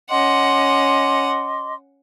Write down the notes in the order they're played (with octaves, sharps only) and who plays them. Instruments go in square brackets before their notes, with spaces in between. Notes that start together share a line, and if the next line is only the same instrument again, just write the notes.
[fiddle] C#4 F#5 [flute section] D#5 C6 D6